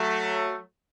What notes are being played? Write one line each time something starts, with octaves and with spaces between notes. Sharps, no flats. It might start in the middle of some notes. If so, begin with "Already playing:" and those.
Already playing: F#3 A3